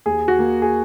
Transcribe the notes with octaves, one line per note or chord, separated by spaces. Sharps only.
D#2 G#4
F#4
A#3
G#4